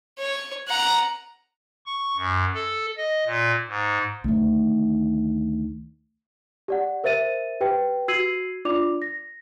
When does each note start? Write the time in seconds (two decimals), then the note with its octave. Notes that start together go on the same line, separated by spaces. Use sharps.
0.19 C#5
0.68 F#5 A#5
1.86 C#6
2.17 F#2
2.54 A4
2.97 D#5
3.26 A#2
3.68 G#2
4.24 D2 D#3
6.68 G4 D5 F#5
7.04 A#4 C5 E5 A6 D#7
7.61 G4 B4 G5
8.08 F#4 E6 G#6 C7 D#7 F#7
8.65 D4 F4 D5 D6 F7
9.02 A#6